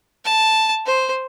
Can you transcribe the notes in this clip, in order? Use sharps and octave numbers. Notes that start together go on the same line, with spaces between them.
A5
C5